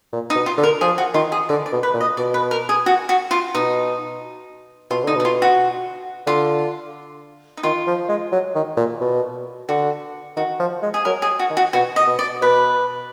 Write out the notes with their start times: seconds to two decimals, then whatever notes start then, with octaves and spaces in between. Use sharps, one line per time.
0.13 A#2
0.30 D#4
0.36 B2
0.46 F4
0.58 D3
0.63 A#4
0.81 F3 G#4
0.98 F#4
1.14 D#3 F4
1.32 G#4
1.49 D3 D5
1.66 D5
1.72 B2
1.83 B4
1.94 A#2
2.01 D#5
2.17 B2 D5
2.34 B4
2.51 A#4
2.69 G#4
2.86 F#4
3.09 F#4
3.31 F4
3.55 B2 D#4
4.91 B2 F4
5.04 D3 D#4
5.16 B2 D#4
5.25 F4
5.42 F#4
6.27 D3 F4
7.57 D#4
7.63 D#3 F4
7.87 F3
8.09 G#3
8.32 F#3
8.55 D#3
8.77 A#2
9.01 B2
9.69 D3 F#4
10.37 D#3 F#4
10.60 F3
10.83 G#3
10.94 G#4
11.05 F#3 A#4
11.22 G#4
11.39 F#4
11.50 D#3
11.57 F#4
11.73 B2 F#4
11.96 D#5
12.07 B2
12.19 D5
12.42 B2 B4